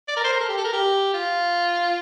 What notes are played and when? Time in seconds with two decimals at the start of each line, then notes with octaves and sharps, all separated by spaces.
0.08 D5
0.17 A#4
0.24 C5
0.32 A#4
0.40 A4
0.49 G4
0.57 A4
0.65 A#4
0.73 G4
1.14 F4